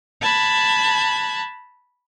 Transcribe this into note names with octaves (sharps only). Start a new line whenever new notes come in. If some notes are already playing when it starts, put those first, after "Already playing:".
A5 B5 F#6 G#6